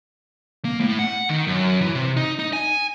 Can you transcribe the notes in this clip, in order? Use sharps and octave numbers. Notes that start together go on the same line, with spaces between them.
A#3
A2
F#5
D#3
F#2
E3
C3
D#4
D#4
G#5